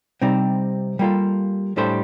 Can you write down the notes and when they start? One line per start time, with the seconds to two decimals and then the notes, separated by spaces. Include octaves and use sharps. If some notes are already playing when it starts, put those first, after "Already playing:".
0.22 C3 G3 C4 D#4
0.99 G3 A#3 F4 A4
1.77 A2 G3 D4 A4 C5